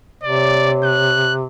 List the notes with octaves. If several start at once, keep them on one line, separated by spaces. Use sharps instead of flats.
C3 C#5 D5
F#6